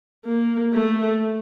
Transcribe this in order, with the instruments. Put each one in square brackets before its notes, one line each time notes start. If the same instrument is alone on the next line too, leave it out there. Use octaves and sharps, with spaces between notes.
[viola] A#3
A3